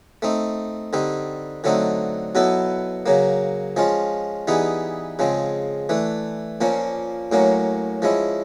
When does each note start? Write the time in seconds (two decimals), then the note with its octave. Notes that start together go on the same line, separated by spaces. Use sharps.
0.22 A3 C4 D#4
0.93 D3 G3 C4 D#4
1.64 D3 F#3 A3 C4 D#4
2.35 B2 F#3 B3 E4 A4
3.06 C#3 F#3 A#3
3.76 F3 G#3 C#4 F4
4.48 E3 G3 B3 D#4 G#4
5.19 C#3 F3 G#3 C4
5.89 E3 A3 D4
6.61 A#2 F3 A#3 C#4
7.32 A2 F#3 A#3 C#4
8.02 F3 G#3 C#4 E4